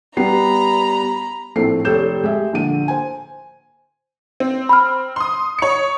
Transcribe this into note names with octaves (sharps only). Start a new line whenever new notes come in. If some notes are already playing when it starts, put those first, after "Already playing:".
G3 B3 A#5 B5 C7
A#1 A2 A3 C4 C7
F1 G4 A4 C#5 G6 E7
G#3 G4 E5
A#1 D3 D#7
C5 G#5
C4
B5 F6
C6 D#6
C#5 C#7